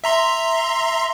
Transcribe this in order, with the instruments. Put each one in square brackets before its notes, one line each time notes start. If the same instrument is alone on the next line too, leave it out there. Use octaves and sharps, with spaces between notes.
[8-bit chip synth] E5 A#5 C6